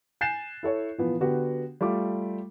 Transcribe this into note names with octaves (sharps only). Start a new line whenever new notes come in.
G#5 F#6 G6 A6 C7 E7
E4 A4 C#5
A#2 E3 F3 B3
D3 B3 F#4 G4
G3 A3 F4 D6